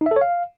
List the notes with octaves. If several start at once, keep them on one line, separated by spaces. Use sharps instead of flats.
D#4
E5
A4
C#5
F5